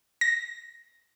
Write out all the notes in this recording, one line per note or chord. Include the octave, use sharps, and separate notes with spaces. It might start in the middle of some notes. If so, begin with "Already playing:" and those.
A#6